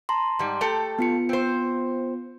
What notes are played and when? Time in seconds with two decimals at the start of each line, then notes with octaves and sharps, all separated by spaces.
0.09 A5 A#5 C6
0.39 G#2 G3
0.61 A3 G4 A4
0.99 B3 F4 C#7
1.29 C4 C5